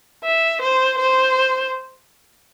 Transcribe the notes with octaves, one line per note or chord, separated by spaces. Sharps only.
E5
C5
C5